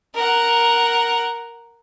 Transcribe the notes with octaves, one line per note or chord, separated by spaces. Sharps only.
A#4 F#5